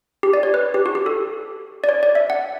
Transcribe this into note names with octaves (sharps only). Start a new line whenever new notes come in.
G4
D5
C#5
B4
G4
F#4
G4
A4
D5
C#5
D5
E5
F#5